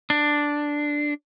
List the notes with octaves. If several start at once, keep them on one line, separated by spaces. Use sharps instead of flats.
D4